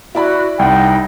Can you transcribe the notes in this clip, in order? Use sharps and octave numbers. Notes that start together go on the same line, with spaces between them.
E4 F#4 D5 B5
C2 D#4 F#5 G5